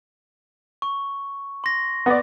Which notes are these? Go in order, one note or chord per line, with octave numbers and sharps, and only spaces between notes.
C#6
C6 A#6
B3 D5